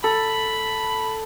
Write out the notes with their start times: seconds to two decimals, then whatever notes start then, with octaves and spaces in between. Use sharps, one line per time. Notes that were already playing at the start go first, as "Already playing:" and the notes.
0.04 A4 B5